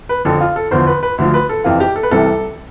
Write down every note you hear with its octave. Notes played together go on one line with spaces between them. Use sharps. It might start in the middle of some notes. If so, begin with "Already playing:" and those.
B4
F2 D3 F3 A4
F4
A4
E2 D3 F3 C5
B4
B4
D2 D3 F3
B4
A4
F2 C3 E3 F4
G4
A4
B4
C2 C3 E3 A4